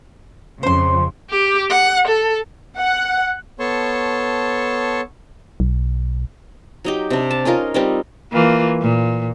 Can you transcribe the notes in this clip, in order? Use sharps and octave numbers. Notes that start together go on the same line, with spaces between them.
F2 C#3 C5 C6
G4
F#5
A4
F#5
B3 A4 C#5 A5 C6 C#6
B1
F#3 D#4 G4
C3 D4
A5
C#4 D#4 F4 A#4
G3 C4 D#4
E3 A#3 F4
A#2